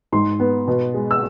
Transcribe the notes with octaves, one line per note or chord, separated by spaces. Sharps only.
G#2 C6
B3
B2
G#3
E6